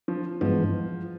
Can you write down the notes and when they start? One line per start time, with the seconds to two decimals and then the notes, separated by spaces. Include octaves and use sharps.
0.08 F3
0.41 G2 E3 F3 G#3 B3